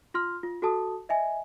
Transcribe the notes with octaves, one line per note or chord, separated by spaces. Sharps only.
F4 C6 F6
F4
F#4 A4 A5 D#6
D#5 E5 G#5